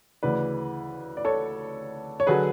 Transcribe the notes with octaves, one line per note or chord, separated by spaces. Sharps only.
D2 C#3 E3 B4 D5
D5
A4 C#5
C#5
D3 F#3 G#4 B4